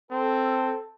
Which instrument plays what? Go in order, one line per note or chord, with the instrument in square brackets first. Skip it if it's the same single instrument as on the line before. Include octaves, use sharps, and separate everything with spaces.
[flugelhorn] C4 [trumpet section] A4